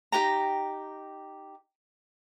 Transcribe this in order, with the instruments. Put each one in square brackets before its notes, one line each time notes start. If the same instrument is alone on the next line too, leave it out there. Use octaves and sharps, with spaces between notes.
[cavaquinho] D#4 G4 G5 A#5